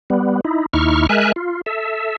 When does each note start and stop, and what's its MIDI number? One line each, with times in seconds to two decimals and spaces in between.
0.10 0.41 55
0.10 0.41 59
0.45 0.66 63
0.45 0.66 64
0.73 1.07 39
0.73 1.07 63
0.73 1.07 64
0.73 1.07 85
0.73 1.07 89
1.09 1.32 56
1.09 1.32 70
1.09 1.32 76
1.09 1.32 80
1.09 1.32 90
1.36 1.61 65
1.66 2.16 69
1.66 2.16 76